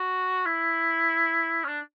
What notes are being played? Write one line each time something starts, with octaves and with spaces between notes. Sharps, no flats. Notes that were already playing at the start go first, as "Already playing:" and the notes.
Already playing: F#4
E4
C#4
D4